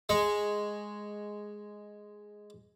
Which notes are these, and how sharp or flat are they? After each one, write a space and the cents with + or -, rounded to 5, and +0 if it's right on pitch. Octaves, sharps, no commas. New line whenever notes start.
G#3 +0 C#6 +0